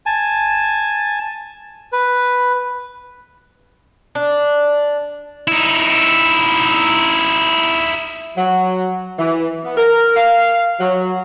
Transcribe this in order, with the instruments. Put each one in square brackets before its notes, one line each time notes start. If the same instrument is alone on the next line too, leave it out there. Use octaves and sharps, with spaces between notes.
[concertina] G#5 A5
B4
[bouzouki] D4
[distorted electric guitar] D#4 E4
[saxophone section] F#3
E3
B3
A#4
F5
F#3